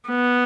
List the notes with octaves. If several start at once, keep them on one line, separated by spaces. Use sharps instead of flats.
B3